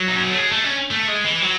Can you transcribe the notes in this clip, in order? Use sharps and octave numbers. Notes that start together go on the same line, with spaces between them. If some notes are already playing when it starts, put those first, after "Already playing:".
Already playing: F#3
D#4
C#4
B3
A3
G#3
A3
C#4
A3
G#3
E3
F#3